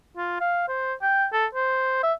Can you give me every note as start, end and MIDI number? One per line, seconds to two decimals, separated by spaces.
0.17 0.40 65
0.40 0.63 77
0.68 0.94 72
1.02 1.27 79
1.33 1.46 69
1.55 2.01 72
2.03 2.13 76